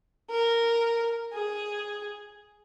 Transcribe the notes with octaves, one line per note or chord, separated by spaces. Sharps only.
A#4
G#4